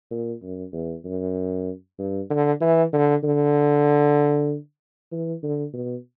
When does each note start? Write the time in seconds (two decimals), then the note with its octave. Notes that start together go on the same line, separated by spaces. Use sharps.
0.11 A#2
0.42 F#2
0.73 E2
1.05 F#2
1.99 G2
2.30 D3
2.61 E3
2.93 D3
3.24 D3
5.12 E3
5.43 D3
5.73 B2